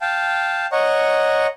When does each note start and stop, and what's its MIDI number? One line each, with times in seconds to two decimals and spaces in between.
0.01 0.66 77
0.01 0.66 79
0.01 0.66 81
0.72 1.47 73
0.72 1.47 75
0.72 1.47 78
0.72 1.47 82
0.72 1.47 85